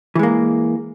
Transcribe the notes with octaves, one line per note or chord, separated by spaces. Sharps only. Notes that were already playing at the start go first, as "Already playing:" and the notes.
E3 G#3 A#3